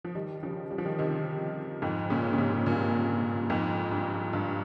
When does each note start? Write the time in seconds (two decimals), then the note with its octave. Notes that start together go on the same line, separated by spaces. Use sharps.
0.04 F3
0.15 D#3 G3
0.43 C#3 F3
0.71 G3
0.78 F3
0.85 D#3 G3
0.98 C3 D#3
1.82 F2 G#2
2.10 A#2 C#3
2.33 C#3
2.38 G#2 C3
2.66 G2 A#2
3.50 F2 G#2
3.91 G2
4.33 G2